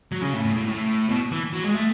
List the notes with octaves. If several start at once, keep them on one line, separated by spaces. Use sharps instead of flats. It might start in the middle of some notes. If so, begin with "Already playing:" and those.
F#3
C#3
A2
A2
A2
A2
B2
E3
F#3
G#3
A3